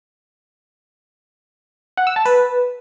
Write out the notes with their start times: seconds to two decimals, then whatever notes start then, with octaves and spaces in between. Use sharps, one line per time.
1.97 F#5
2.07 E6
2.16 A5
2.26 B4